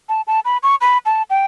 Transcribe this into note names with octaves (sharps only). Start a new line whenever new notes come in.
A5
A5
B5
C#6
B5
A5
G5